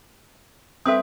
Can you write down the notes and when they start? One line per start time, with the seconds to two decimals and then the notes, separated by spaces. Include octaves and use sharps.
0.86 C4 A4 B4 E5 D#6